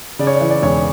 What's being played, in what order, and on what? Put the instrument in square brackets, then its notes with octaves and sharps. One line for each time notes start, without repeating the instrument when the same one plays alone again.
[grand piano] C#3 D5
C#5
D5
E3
D5
E1 C#5